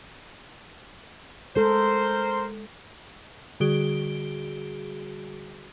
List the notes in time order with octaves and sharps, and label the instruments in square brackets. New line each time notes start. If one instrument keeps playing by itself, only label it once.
[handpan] G#3 A4 [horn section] A#4 C5
[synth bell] D3 G3 F#4 G#4 D7 G7